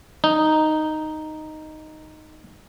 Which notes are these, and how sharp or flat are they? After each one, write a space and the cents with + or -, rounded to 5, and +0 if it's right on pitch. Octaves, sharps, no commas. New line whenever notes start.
D#4 -5